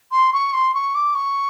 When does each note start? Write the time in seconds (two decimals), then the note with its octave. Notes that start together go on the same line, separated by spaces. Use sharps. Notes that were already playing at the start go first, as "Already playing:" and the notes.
0.11 C6
0.33 C#6
0.53 C6
0.74 C#6
0.94 D6
1.14 C#6